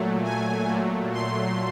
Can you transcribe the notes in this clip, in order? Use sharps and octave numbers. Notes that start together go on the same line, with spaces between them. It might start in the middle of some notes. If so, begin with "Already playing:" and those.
Already playing: A#2 F#3 A3
G#5
A#2 F#3 A3
C6